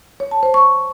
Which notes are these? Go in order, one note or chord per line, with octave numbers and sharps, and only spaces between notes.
C#5
A5
C5
C#6